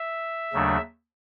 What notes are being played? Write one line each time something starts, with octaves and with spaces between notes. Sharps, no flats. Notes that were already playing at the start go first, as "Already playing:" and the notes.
Already playing: E5
D#2 C#3 F#3 A3 D4